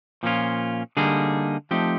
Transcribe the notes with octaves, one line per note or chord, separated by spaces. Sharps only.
A#2 F3 A#3 C#4 F4
D3 G3 A#3 D#4 G#4
F3 A3 C4 D#4 G4